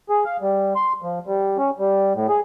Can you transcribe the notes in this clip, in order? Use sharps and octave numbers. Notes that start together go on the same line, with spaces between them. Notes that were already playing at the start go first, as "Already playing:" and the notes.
G#4
F5
G3
C6
F3
G3
C#4
G3
A2
G#4